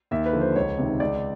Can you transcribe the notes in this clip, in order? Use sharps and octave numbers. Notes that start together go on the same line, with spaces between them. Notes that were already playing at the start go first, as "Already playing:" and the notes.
D#2 E5
B4
D3 F3
C5
C#2 C#5
C3 D#3
C#2 D5